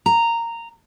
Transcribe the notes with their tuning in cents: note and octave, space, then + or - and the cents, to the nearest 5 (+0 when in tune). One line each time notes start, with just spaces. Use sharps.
A#5 -10